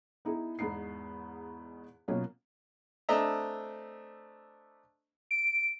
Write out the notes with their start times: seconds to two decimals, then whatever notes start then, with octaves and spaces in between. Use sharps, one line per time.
0.25 B3 D#4 E4 G#4
0.59 E2 G#2 B3 D#4 C7
2.08 B2 F#3 A#3 C#4 F4
3.09 A3 C4 D4 D#5 E5 A#5
5.31 D7